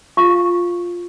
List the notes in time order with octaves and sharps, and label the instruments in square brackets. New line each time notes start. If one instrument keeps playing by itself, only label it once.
[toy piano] F4 F5 C#6